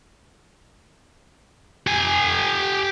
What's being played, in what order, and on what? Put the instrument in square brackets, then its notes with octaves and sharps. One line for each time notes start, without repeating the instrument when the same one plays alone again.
[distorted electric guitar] G4 G#5